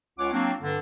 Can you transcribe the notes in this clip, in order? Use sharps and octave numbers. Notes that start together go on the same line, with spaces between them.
C#2 C#4 F4 C#5 F#5 D6
F#3 A#3 C4 D4
G2 D3